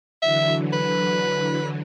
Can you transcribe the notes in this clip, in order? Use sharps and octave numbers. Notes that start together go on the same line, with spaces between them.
D3 E3 F#3 E5
B4